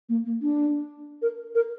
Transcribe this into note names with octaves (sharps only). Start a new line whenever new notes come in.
A#3
A#3
D4
A#4
A#4